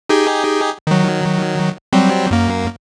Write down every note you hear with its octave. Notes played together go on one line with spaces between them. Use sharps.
D#4 G4 G#4
D#3 F#3
F#3 G3 C4
F#2 A#3